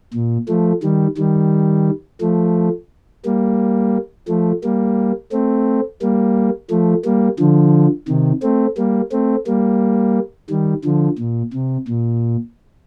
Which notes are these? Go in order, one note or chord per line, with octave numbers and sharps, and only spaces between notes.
A#2
F3 A3
D#3 G3
D#3 G3
F3 A3
G3 A#3
F3 A3
G3 A#3
A3 C4
G3 A#3
F3 A3
G3 A#3
D3 F3
C3 D#3
A3 C4
G3 A#3
A3 C4
G3 A#3
D#3 G3
D3 F3
A#2
C3
A#2